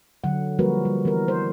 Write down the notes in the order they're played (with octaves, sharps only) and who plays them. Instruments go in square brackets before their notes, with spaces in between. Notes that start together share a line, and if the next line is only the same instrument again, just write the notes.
[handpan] D3 F#3 F#5
F3 G3 A#3 F#4 A#4 B4
G3
E3 B3 A#4
C5